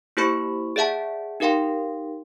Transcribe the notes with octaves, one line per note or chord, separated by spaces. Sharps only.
A#3 E4 G4 C5 B5 C#6
G#4 D5 E5 F#5 A5
D#4 G4 A#4 F5 G5 C6